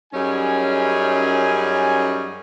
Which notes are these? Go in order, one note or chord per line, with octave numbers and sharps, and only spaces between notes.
F#2 G3 C#4 D#4 G#4 G#5